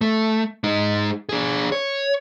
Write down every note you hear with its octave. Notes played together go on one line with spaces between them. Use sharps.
A3
G#3 D#4
D4 G#4
C#5